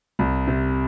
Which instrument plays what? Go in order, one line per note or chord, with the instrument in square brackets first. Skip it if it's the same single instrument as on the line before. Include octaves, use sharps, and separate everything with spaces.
[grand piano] C2
C3